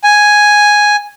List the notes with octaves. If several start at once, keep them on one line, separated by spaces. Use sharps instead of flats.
G#5